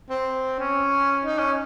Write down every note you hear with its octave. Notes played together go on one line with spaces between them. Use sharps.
C4
C#4
D#4
C#4